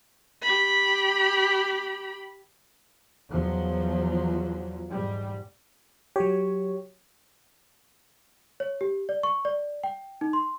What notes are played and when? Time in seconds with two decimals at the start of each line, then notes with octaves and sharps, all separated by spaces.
0.43 G4 B5
3.31 E2 F3 F#3
4.90 G#2 G3
6.16 F#3 G4 C#5
8.60 C#5
8.81 G4
9.09 D5
9.23 C#6
9.45 D5
9.84 G5
10.21 D#4
10.33 C6